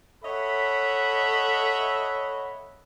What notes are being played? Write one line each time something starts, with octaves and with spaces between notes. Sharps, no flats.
A4 C#5 D#5 E5 F#5 B5